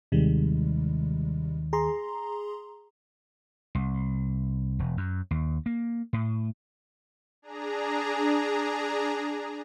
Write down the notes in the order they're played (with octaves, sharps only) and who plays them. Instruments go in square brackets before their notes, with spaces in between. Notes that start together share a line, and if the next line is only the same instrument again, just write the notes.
[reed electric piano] D#2 D#3 [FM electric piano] C3 G3 G#3
[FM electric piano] G#4 A#5 C6
[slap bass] C2
E1
F#2
D#2
A#3
A2
[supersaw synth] D4 G#4 A#5